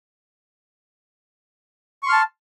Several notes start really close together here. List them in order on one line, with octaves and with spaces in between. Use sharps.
C#6 C6 F6 A5